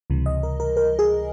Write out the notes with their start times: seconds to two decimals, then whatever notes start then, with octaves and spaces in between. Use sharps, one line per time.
0.10 C#2 C3 E3 G3
0.26 D#5
0.43 A#4
0.60 A#4
0.77 A#4
0.99 G#4